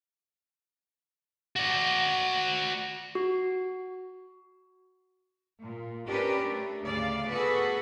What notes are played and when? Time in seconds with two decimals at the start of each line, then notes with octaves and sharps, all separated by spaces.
1.56 F#4 D5
3.15 F#4
5.60 A#2
6.07 C#4 D4 G4 A#4 B4
6.42 A3
6.82 D2 C#3 D5 F5
7.31 B3 F#4 G#4 A4 B4